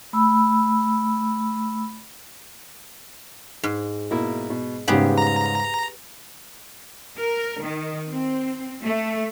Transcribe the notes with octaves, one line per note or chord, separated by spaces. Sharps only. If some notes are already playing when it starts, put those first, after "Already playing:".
A3 B5 E6
G#2
B2 A#3 E4
B2
E2 G#2 C#3 G3 B3 G4 G#4
A#5
A#4
D#3
C4
A3